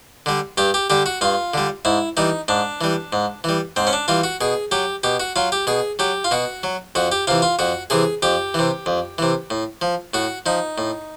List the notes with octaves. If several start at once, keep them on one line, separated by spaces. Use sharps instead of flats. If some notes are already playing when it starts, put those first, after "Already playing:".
D3 G3
G2 G4
G4
D3 G3 G4
F#4
G2 F4
D3 G3
G#2 E4
E3 G3 D#4
G#2 D4
E3 G3
G#2
E3 G3
G#2 C4
C#4
D4
E3 G3 F4
F#4
B2 G#4
F#3 G4
B2 G4
F#4
F#3 F4
G4
B2 G#4
F#3 G4
F4
B2 F#4
F#3
F2 F#4
G4
C3 E3 F4
F4
F2 F#4
C3 E3 G#4
F2 G4
C3 E3
F2
C3 E3
A2
F3
A2 F#4
F3 D#4
A2